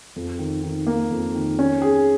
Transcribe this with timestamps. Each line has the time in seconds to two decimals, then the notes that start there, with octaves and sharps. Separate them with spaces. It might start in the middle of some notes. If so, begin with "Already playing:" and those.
0.16 F2
0.39 D#3
0.63 D#3
0.87 A#3
1.11 F2
1.35 D#3
1.59 C#4
1.82 G#4